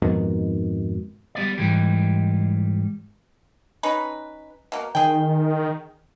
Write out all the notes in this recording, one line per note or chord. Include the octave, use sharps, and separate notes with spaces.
F2 G#2 B2 D#3
G3 B3 D5
G#2 E3 G3 G4
C#4 D#4 B4
B2 A#3
D#3 G#4 G5